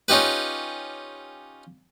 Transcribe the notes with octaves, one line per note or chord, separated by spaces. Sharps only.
C#4 D#4 F4 G4 B4